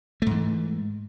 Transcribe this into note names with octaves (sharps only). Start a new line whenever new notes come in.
G#2 E3 A3